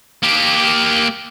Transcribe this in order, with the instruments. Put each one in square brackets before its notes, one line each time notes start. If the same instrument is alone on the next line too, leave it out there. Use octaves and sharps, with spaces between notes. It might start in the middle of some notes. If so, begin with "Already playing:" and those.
[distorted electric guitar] A#3 G4